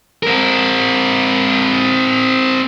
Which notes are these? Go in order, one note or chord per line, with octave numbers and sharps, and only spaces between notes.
C4 A#4